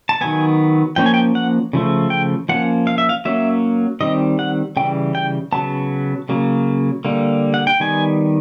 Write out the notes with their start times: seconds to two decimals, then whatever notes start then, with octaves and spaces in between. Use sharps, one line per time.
0.09 A5
0.21 D#3 F#3 B3 G#5
0.96 F3 A#3 C#4 G5
1.06 G#5
1.14 G5
1.35 F#5
1.73 C#3 F3 A3
2.10 G5
2.49 F3 A#3 C#4 F#5
2.87 F5
2.98 E5
3.09 F5
3.25 F#3 A#3 C#4 E5
4.01 D#3 G3 C4 D#5
4.39 F#5
4.77 C#3 E3 G3 G5
5.15 G5
5.52 C#3 F#3 B3 A5
6.29 C#3 F#3 A#3
7.05 D3 G3 A#3
7.54 F#5
7.67 G5
7.80 D#3 G3 B3 G#5